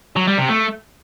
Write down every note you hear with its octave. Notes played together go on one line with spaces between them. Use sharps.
F#3
G3
C3
A3